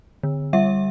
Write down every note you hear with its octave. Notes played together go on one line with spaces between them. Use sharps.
D3
G3 E5